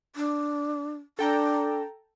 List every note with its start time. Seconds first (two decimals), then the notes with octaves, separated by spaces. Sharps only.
0.16 D4
1.19 D4 A4 G5 A#5